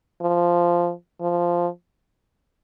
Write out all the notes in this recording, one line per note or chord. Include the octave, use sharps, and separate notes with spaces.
F3
F3